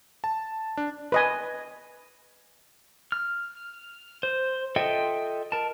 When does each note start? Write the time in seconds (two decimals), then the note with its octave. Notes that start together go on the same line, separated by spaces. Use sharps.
0.24 A5
0.77 D4
1.12 B4 D#5 G#5
3.12 F6
4.23 C5
4.76 F4 A4 D#5 E5 G5
5.52 A#4 A5